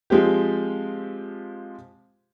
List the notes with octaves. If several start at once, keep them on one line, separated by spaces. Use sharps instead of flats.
F3 G#3 C4 G4